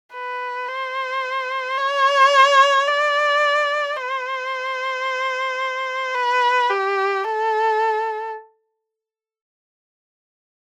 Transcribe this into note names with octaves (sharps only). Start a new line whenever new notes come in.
B4
C5
C#5
D5
C5
B4
G4
A4